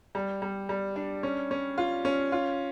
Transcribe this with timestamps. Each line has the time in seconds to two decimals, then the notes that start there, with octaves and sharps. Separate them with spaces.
0.15 G3
0.42 G3
0.69 G3
0.96 D4
1.23 C#4
1.51 C#4
1.78 F4
2.05 C#4
2.32 F4